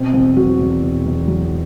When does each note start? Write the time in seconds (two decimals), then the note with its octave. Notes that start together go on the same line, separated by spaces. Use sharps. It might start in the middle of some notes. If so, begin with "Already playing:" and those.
Already playing: B2 C4
0.14 E2 C4
0.36 F#3 F#4
0.59 E2
0.83 B2
1.05 E2
1.27 F#3